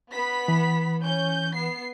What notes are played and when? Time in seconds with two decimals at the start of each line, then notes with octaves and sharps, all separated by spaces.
0.11 B3 B5 B6
0.48 E3
1.02 C#4 G6
1.55 B3 C7